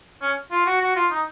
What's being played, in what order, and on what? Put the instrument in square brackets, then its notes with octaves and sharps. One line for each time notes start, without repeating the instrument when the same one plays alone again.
[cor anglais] C#4
F4
F#4
F#4
F4
D#4